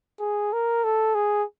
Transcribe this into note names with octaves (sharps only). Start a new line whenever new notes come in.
G#4
A#4
A4
G#4